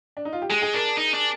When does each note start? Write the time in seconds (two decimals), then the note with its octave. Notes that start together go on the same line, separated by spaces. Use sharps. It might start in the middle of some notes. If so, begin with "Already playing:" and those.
0.17 D4
0.25 D#4
0.33 F4
0.42 G4
0.50 G#3 G#4
0.62 G#4
0.74 D4 A#4
0.97 D#4
1.14 D4